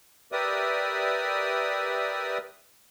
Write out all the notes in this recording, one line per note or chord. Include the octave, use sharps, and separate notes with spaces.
G4 A#4 B4 D5 E5 D#6